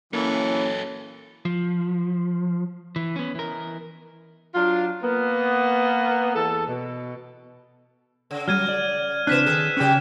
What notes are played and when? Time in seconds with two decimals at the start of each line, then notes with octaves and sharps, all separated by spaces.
0.13 E3 F#3 A#3 C#4 A4
1.45 F3
2.96 E3
3.16 B3 C#4
3.35 E3 A#4
4.55 F#3 D4 F4
5.03 A#3 B3
6.35 E2 A4
6.67 B2
8.31 C#3
8.48 F#3 G3 F6 G#6 D#7
8.69 D5
9.27 C#3 E3 C4 D4 B4 F#6 B6 E7
9.46 D#3 G#4 A4
9.77 G#2 C#3 F#3 C#4 G4